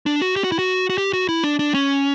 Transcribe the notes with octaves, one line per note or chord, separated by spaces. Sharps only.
D4
F#4
G4
F#4
E4
F#4
F#4
G4
F#4
E4
D4
D4
C#4